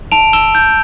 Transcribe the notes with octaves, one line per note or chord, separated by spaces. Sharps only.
A5 D7 F7
E6 E7 G7
G6